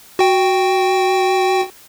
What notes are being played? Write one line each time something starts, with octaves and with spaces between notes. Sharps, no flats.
F#4 G5